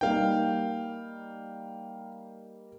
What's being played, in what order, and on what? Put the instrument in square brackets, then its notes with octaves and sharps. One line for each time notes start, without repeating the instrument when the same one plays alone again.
[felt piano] G3 A#3 D#4 [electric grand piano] F5 G5